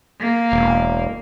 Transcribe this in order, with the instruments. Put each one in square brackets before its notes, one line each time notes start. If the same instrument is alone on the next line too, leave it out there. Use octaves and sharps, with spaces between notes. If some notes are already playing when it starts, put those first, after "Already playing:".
[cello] A#3
[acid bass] E1